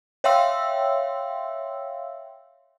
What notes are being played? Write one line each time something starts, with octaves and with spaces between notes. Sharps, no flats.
C#5 E5 F5 G5 C6 E6